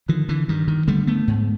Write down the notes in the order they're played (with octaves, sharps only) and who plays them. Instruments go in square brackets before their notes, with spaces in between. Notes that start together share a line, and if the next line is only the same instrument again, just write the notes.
[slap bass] D3 D#3 F3
D3 E3
G2 D#3
D#3
D3 G3 A3
A3 B3
G#2